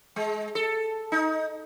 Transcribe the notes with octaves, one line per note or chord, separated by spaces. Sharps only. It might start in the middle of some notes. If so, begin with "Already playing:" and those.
G#3
A4
D#4